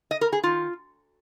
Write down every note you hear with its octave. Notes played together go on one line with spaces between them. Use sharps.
D#5
A#4
G#4
D#3 F4